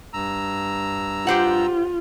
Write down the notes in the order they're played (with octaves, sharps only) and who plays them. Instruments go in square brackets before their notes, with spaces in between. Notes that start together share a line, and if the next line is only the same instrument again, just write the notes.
[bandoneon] G2 A#5 E6
[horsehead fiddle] F4 [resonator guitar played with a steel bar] G4 C5 F#5